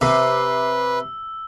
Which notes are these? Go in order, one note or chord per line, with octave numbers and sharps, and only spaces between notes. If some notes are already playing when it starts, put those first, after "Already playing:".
C3 B4 E6